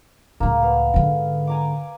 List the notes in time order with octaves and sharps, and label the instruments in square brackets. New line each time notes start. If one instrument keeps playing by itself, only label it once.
[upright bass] C#2 A2 [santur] A#3
[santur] B3 F5
[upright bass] G#2 D3
[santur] G#5 A#5 D6